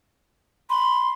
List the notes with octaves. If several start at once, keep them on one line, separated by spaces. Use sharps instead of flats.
B5 C6